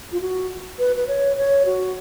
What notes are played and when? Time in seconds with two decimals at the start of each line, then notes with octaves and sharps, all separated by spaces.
0.12 F4
0.21 F#4
0.79 B4
0.96 B4
1.08 C#5
1.37 C#5
1.66 F#4